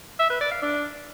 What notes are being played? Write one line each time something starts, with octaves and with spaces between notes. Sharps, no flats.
E5
B4
D5
F5
D4